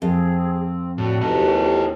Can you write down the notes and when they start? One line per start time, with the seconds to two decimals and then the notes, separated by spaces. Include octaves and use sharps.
0.02 F2 C4 G#4
0.98 A2 D4 F#4
1.21 D#2 C3 E3 D#4 A4